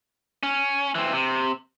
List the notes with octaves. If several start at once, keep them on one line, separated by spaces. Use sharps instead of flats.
C#4
E3 C4
C3